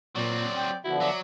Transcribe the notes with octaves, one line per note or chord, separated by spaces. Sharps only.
A#2 F#3 C4 D5
G5
D3 F3 B3 E4 F#4
F#3 D5 E5